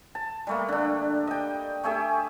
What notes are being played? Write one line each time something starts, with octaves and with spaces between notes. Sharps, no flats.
A5
G3 A3 A#3
D3 D4
D#5 G5
A3 G4 G#4 E5